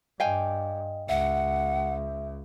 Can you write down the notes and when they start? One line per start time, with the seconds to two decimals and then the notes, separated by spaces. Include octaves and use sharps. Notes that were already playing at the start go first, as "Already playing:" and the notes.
0.20 G2 D#5 F5 G5 G#5
1.09 C#2 E5 F#5